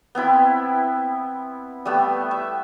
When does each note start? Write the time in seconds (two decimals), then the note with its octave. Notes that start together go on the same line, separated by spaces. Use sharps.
0.15 B3 C4 E4 B5
1.85 G3 A3 B3 E6
2.31 E5